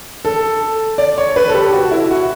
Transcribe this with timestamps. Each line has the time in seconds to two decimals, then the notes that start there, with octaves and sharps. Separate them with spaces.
0.25 A4
0.98 D5
1.18 C#5
1.36 B4
1.49 A4
1.54 G4
1.73 F#4
1.91 E4
2.11 F#4